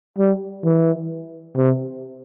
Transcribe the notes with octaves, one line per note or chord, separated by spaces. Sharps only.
G3
E3
C3